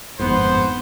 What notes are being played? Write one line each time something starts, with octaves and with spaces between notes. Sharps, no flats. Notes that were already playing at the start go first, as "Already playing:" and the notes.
G1 F2 G#2 B3 C5